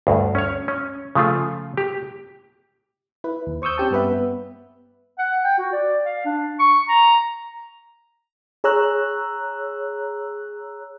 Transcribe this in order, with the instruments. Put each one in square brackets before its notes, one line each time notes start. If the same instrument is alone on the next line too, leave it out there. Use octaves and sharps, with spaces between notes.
[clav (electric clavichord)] D2 G2
C#4 C#5
C#4
C#3 F3 A3 F4
G4
[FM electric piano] E4 B4
D#2
C5 C#6 D#6 E6 G6
C4 C#4 G4 A5
G2 B3 B4 E5
B3
[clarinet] F#5
G5
F#4
D5
F5
D4
C#6
A#5
[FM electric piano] G#4 C#5 A#5 E6 F#6